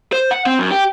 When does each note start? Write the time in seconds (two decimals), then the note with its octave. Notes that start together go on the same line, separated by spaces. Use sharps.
0.13 C5
0.31 F#5
0.46 C4
0.59 F#2
0.71 G4